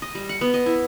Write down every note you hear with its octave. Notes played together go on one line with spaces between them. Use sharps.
D#5
G3
F#5
B3
D#5
E4